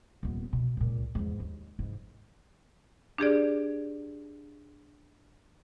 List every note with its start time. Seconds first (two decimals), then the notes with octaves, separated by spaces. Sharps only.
0.23 D#1 B3
0.53 B2
0.77 C#2 A#2
1.15 E2 G#2
1.40 D#2
1.79 G#2 E3
3.18 D4 G4 G#4 D5